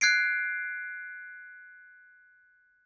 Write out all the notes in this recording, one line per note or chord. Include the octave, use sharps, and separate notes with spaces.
F#6 G#6 C7 D7